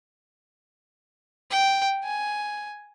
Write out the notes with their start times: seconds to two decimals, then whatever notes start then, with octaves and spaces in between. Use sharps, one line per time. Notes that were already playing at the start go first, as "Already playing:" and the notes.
1.51 G5
2.04 G#5